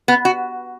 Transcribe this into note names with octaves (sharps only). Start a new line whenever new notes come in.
B3
F#4